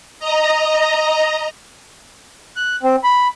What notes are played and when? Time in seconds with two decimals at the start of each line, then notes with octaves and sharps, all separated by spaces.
0.19 D#5 A#5
2.56 F#6
2.83 C4
3.04 B5